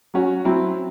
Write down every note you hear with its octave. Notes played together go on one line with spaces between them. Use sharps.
F#3 C#4 F#4
F#3 C4 E4